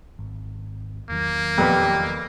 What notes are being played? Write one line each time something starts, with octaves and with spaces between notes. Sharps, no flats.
G#1
E2 D#3 F#3 A#3
F2 A#2 B3 G4